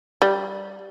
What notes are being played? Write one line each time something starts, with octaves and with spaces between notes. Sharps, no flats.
G3